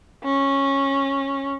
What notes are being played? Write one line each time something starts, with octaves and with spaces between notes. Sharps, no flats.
C#4